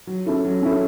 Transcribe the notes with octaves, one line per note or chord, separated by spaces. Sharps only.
F#3
C#4 E4 A4
F#3
C#4 E4 A4